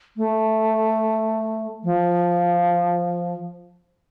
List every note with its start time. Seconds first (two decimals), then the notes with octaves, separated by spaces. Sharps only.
0.17 A3
1.84 F3